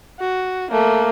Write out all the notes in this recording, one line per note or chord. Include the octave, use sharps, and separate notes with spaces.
F#4
A3 A#3